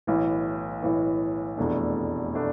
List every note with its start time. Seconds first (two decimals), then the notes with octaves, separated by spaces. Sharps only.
0.07 B1 A2 E3
0.83 B1 A2 E3
1.58 F1 E2 B2 A3 D4
2.34 B2 A3 D4